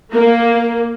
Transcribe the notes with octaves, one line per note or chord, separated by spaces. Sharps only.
A#3